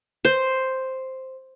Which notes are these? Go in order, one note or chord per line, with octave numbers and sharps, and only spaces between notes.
C5